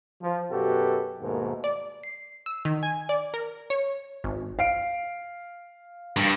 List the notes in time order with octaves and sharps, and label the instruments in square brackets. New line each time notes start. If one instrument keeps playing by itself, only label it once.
[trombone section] F3
F#2 B2 F#4 G4 A4 B4
D#2 G#2 B2 A3 A#3
[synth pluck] D5
C7
E6
D#3
G#5
D5
A#4
C#5
G#1
[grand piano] F5 C7 D7
[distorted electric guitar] G2